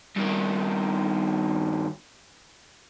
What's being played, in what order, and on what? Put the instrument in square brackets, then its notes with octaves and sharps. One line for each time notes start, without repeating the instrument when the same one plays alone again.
[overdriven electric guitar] G2 D#3